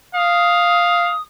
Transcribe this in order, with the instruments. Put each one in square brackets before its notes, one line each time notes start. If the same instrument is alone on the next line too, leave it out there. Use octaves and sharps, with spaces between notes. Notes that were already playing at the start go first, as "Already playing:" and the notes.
[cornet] F5 [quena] D#6